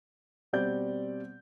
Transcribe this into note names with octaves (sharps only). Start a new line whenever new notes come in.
B2 G3 C4 D5 G6